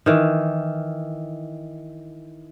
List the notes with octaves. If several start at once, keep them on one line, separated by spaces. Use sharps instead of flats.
D#3 E3